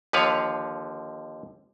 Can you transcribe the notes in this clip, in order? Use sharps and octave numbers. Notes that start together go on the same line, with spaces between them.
D#2 D3 F3 B4 C#5 F5